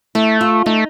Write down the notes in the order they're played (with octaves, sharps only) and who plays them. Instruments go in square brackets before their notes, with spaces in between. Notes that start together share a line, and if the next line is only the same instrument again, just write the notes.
[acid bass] A3 [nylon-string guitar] E4
[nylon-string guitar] F4
[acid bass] A3 [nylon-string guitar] D#4